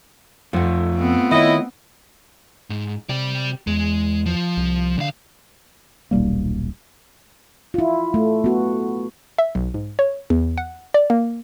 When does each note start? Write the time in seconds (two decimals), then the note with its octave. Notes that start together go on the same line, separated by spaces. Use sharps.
0.53 F2 A3 F4 F#5
0.96 B3 C4
1.31 D#3 E4 C#5 D#5
2.70 G#2
3.09 C3 G4 D5
3.67 E2 G#3
4.26 F3
4.57 C2
4.98 C2 D3 F5
6.11 D#1 B1 G3 A#3
7.74 E4 F4
8.14 A3
8.44 B3 F#4
9.38 E5
9.55 B1
9.74 G#2
9.99 C#5
10.30 E2
10.58 F#5
10.94 D5
11.10 A#3